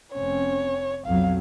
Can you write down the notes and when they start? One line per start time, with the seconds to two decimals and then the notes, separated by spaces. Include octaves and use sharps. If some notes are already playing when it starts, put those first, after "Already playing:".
0.14 F1 C4 C#4 C#5
1.06 B1 F2 F#3 F5